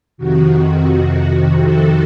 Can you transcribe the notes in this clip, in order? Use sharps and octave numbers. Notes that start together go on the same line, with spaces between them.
F2 C3 D#3 F#4
A4